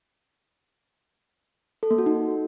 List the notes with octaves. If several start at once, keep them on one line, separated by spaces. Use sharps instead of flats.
A4
A#3
F#4
D#4